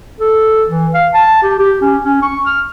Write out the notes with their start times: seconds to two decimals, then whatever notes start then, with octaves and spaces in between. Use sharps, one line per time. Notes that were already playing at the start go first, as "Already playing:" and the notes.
0.20 A4
0.69 E3
0.94 F5
1.14 A5
1.43 G4
1.59 G4
1.82 C#4
2.05 C#4
2.22 C#6
2.46 F6